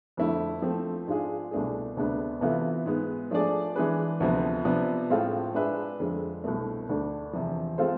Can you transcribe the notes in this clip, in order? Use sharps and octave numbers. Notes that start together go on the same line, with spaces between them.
F2 D3 A3 E4
F3 A3 C4
G#2 G#3 D4 F4 G#4
C2 B2 A3 D4 G#4
D2 C3 G#3 B3 D4
C3 E3 B3 F4 A4
G#2 G#3 B3
F3 A3 D4 G#4 D5
E3 G#3 D4 G#4 B4
D2 C3 F3 B3
C3 F3 B3 D4
A2 G#3 C4 F4 A4
G#3 D4 G#4 B4 E5
F2 D3 G#3
C2 B2 A3
D2 D3 A3 D4
E2 C3 F3
G#3 C4 F4 A4 C5